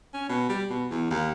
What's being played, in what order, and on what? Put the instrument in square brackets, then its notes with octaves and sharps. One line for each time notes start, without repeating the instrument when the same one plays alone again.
[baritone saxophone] C#4
B2
G3
B2
E2
D#2